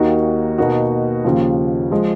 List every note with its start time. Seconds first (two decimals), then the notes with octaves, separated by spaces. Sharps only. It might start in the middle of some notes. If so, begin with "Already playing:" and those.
Already playing: D#2 D#3 A#3 D#4 F#4
0.58 B2 A#3 D#4 F#4
1.24 D#2 C#3 F3
1.91 F3 G#3